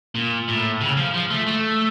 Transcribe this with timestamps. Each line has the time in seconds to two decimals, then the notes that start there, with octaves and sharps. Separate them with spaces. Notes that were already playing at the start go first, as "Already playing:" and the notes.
0.15 A#2
0.48 A2
0.81 C#3
0.97 F3
1.14 F3
1.31 A3
1.47 A3